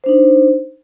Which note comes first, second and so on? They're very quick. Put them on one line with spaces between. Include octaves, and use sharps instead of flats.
C5 D4 D#4